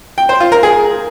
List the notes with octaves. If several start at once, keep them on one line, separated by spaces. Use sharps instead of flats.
G5
C5
F4
A#4
G#4